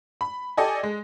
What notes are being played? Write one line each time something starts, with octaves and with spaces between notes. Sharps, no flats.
B5
G4 A4 D5 D#5 G#5
G#3